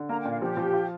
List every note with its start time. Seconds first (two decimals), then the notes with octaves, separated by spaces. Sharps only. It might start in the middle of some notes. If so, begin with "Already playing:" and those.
Already playing: D3
0.09 A#3 A#5
0.20 G5
0.25 A#2 F5
0.42 F3 G4
0.57 F3
0.73 F4